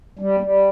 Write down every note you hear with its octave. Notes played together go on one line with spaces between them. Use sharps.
G3
G3